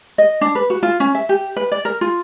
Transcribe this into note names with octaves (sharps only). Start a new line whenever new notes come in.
D#5
D4
B4
F#4
F4
C#4
E5
G4
B4
D5
A#4
F4